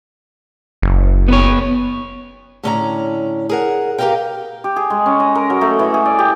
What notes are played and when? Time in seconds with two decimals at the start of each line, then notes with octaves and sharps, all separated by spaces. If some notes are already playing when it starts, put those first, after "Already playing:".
0.82 F#1
1.28 B3 B4 C#5
2.63 A2 D3 C#4 D5 E5 A#5
3.49 G#4 A#4 F#5
3.98 G4 A#4 C5 D#5 F5 G5
4.64 G4
4.76 G#4
4.90 G#3
5.06 C#4
5.20 D#5
5.35 A#4
5.50 F#3
5.61 A3
5.79 E3
5.94 G#4
6.06 D5
6.19 G4